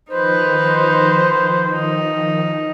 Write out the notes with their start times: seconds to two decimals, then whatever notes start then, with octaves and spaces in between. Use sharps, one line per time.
0.11 D#3 F3 D#4 B4 C5
1.71 D#4